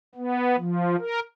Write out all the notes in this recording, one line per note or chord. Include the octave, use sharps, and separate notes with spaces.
B3
F3
A#4